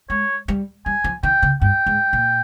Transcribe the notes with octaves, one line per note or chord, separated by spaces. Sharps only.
G#3 C#5
G3
G3 G#5
F3
D#3 G5
C#3
G2 G5
G#2
A#2